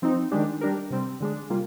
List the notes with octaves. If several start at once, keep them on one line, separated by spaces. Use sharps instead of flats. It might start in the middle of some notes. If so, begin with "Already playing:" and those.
F3 C4 D#4
D#3 G#3 D4 G4
G3 D4 G4 A#4
C3 G3 C4
D3 G#3 D4
C3 G3 A#3 F4